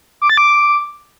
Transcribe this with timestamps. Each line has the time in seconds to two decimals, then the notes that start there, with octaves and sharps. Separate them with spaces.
0.22 D6
0.30 A6
0.37 D6